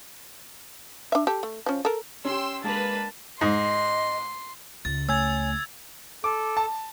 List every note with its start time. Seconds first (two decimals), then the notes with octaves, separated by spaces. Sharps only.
1.12 D4 E5
1.27 G4 A4
1.43 A3
1.66 F3 C#4
1.85 A4 A#4
2.25 C#4 G4 G5 C6 E6
2.64 G#3 A#3 D4 B4 A5
3.41 G#2 D#5 C6
4.85 C#2 A6
5.09 A3 C#5 G#5 E6 G#6
6.24 A4 D6
6.57 A5